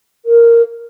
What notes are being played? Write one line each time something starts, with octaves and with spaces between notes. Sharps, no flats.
A#4